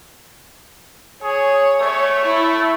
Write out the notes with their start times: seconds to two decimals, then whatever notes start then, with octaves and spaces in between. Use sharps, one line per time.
1.23 G#4 C#5
1.80 A3 C#5
2.26 E4